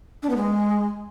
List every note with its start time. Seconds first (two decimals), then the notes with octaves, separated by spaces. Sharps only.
0.23 D4
0.30 B3
0.37 G#3